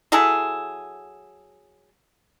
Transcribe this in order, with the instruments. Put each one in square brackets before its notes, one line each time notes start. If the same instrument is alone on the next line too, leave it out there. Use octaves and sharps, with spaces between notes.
[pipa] F#3 E4 G#4 A4